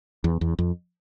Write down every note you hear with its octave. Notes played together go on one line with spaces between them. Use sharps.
E2
E2
F2